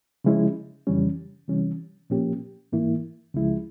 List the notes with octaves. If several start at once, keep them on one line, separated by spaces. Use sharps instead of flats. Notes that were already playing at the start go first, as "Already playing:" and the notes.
C#3 F3 G#3 C#4 E4
F2 C#3 E3 G3 C#4
C3 E3 G3 C#4
A#2 F3 A#3 C#4 G4
G#2 E3 A#3 E4
C#2 C#3 F3 G#3 E4